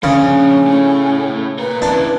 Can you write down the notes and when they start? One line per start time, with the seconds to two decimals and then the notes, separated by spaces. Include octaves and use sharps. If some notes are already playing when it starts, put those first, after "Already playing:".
0.03 C#3 F3 C#4 D4
0.67 A2 A3
1.59 F4 A#4 B4
1.82 C#3 D4 E4